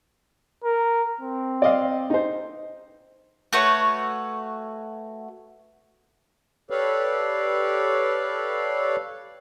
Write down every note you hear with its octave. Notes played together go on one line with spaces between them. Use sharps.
A#4
C4
D5 D#5 F5
D#4 C5
A3 F#4 B4 C#5
G4 A4 B4 C#5 D5 F5